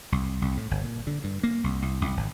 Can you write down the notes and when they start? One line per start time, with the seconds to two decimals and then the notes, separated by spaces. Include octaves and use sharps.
0.12 C2
0.42 C2
0.57 A2
0.71 G1
0.82 A#2
1.07 D3
1.24 G2
1.43 A#3
1.64 C2
1.82 C2
2.01 C2
2.17 G#1